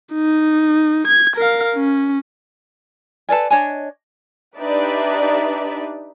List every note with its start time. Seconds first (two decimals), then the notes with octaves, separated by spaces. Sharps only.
0.14 D#4
1.07 G#6
1.37 A#4 F5
1.76 C#4
3.29 A4 B4 D5 G#5
3.50 D4 C#5 D#5 G#5
4.58 D4 D#4 G4 B4 D5 E5